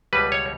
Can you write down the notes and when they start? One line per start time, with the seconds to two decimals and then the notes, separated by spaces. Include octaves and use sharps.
0.13 C#2 B2 G3 B4
0.32 C#5